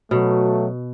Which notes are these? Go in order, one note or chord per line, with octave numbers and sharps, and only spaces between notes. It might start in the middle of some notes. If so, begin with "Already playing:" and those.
B2 F#3 A3